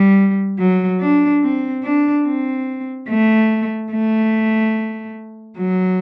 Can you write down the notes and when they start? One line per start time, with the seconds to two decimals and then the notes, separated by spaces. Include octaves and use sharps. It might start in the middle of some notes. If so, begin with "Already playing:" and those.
Already playing: G3
0.59 F#3
1.01 D4
1.42 C4
1.84 D4
2.26 C4
3.09 A3
3.92 A3
5.58 F#3